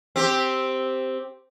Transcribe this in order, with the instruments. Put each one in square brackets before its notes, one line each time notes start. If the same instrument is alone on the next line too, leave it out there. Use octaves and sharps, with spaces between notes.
[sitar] C4 G4